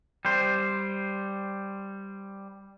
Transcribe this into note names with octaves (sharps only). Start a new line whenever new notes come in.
G3 C5